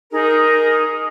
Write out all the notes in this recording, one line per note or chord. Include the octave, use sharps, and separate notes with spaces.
D#4 G#4 A#4